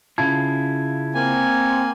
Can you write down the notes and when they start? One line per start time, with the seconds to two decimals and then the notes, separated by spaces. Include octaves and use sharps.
0.18 C#3 E4 F4 A5 G#6
1.15 A#3 C4 G#5